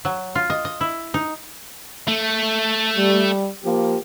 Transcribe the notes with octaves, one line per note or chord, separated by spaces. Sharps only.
F#3
F4
D#5
D#5
E4
D#4
A3
G3
F3 A#3 G4